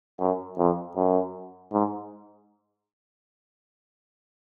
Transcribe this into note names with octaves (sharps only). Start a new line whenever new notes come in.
F#2
F2
F#2
G#2